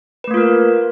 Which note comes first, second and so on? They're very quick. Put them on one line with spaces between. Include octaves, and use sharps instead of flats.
B4 A3 A#3 F4 A#4